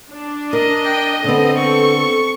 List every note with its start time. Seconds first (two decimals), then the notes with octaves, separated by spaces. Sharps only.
0.11 D4
0.53 A#4 D#5
0.84 G5
1.24 D3 B3 C4 A4
1.57 C#6